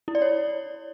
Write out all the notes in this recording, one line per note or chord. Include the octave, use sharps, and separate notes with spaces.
E4
D5
C#5